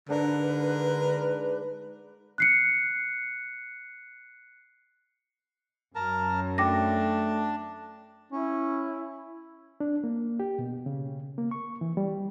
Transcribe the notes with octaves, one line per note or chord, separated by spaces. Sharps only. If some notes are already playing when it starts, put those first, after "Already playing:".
G#2 D3 D4 A#4 B4 D6
F#6 C7 C#7
F#2 A#4 A5 A#5
A3 D4 G5 A5 D6 A#6
C#4 E4
D4
A#3
G4
B2
C#3
A#3
C#6
E3
G3